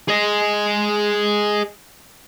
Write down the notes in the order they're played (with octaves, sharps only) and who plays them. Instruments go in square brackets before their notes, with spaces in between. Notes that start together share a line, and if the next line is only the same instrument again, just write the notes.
[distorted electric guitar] G#4 D#5